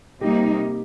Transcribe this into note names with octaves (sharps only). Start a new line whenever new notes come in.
C3 G3 A#3 D#4 G4